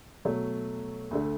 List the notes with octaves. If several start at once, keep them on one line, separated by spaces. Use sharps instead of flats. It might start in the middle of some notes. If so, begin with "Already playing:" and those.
B2 F#3 A3
D2 D3 A3